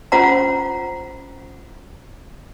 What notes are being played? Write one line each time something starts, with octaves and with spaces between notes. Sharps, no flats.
C#4 F4 C5 F#5 A#5